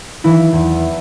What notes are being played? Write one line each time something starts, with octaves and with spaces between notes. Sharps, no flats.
E3 E4
E2